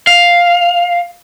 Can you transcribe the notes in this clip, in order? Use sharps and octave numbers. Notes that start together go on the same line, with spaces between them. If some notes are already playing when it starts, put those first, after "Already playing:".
F5